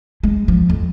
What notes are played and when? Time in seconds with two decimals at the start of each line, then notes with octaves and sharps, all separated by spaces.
0.23 G#3
0.48 F3
0.70 F2